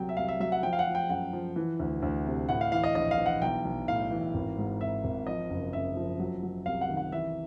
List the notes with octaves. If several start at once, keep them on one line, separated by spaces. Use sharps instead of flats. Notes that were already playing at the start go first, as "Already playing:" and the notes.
Already playing: C2 F#3 G5
E5
C2 F5
E5
F#3 E5
F#5
F3 G5
F5
F#5
F3
G5
F#2 F#5
F3
E3
D2
D2
C3
A2 F#5
F5
E3 F5
D#5
A#1 D#5
F5
E3
F#5
B1 G5
B1
A2 F5
E3
G#1
G#2
G#1 E5
G#1
F3 D#5
F#1
F#1 E5
F3
F#3
F#3
C2 F5
F#5
D#3
F#5
E3 E5